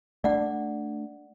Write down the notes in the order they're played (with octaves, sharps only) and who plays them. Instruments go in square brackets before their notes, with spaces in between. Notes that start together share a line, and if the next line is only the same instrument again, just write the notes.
[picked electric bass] A3 D4 [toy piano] D5 F#5